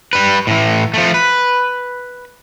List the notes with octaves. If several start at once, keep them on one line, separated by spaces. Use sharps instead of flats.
G3 B4
A2 E3
F3 A3
B4